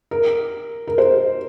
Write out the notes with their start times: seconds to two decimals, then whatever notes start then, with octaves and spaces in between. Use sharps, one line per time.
0.11 A#4
0.87 A#4
0.98 C5